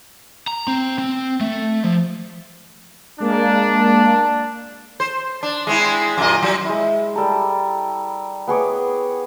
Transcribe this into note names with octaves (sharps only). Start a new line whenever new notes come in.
A#5
C4
C4
A3
F3
G#3 A#3 D4
C5
D4
G#3 C4 E4
F#2 A#2 D#5
F#3
G#3 E4
G3 A4 A#5
B3 G#4 C#5 D6